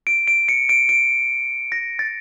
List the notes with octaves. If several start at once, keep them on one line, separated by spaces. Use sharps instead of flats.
D7
D7
C#7
D7
D7
A#6
A6